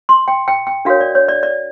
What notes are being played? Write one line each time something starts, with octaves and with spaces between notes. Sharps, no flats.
C6
G5
G5
G5
D4 F#4 A#4 C#5 F5
D5
C#5
D5
D5